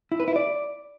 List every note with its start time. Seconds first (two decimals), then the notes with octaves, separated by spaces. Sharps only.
0.12 E4
0.20 B4
0.28 E4
0.36 D5